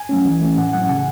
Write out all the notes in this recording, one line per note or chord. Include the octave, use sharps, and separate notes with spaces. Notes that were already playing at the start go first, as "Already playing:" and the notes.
Already playing: G#5
F#3 A3 C#4
E3
A3 C#4
A2 F#5
F#3 C#4 F#5
C#3 G#5